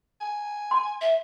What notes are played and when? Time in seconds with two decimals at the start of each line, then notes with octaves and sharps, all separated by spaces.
0.21 G#5
0.71 C6
1.01 E5